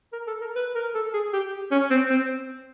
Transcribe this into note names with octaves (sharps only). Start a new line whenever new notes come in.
A#4
A4
A#4
B4
A#4
A4
G#4
G4
C#4
C4
C4